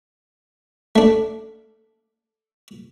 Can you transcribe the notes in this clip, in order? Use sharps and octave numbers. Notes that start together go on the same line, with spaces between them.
A3 D4